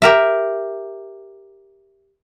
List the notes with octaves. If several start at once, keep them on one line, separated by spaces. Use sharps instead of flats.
G4 A#4 E5